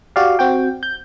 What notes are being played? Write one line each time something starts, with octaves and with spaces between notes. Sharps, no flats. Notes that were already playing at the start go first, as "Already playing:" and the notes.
F#4 G4 D5 F5
C4 F#4 G5
G6